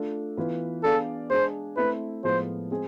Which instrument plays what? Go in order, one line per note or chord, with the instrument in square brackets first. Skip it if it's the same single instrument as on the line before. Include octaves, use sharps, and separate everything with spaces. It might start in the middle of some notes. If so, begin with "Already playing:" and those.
Already playing: [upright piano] A3 D4 F4 A4
E3 B3 F4 B4
[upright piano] B3 D4 G#4 D5 F5 [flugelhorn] A4
[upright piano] G#3 D4 G#4 [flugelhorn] C5
[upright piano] A3 C4 E4 [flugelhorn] B4
[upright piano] A2 F3 G#3 B3 F4 [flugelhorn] C5
[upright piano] G#3 C4 G#4